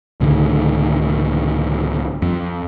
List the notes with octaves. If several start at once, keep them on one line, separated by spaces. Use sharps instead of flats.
C#2 A2 D3 D#3
F2